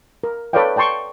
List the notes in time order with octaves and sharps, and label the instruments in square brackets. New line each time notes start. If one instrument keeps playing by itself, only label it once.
[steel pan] A#4
A4 B4 C#5 D5 F5 G5
D5 G5 A5 C6 C#6